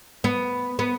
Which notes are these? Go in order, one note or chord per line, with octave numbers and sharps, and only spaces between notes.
B3
B3